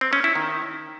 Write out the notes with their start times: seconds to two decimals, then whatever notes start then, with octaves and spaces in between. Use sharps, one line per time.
0.01 C4
0.13 C#4
0.24 E4
0.35 D#3